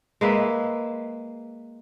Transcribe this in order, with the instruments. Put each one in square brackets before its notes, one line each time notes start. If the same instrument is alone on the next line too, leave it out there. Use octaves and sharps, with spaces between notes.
[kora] G#3 A#3 B4 E5